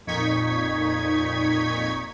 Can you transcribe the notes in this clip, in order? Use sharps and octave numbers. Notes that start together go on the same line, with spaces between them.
F2 A#2 D#4 C#6 G#6 B6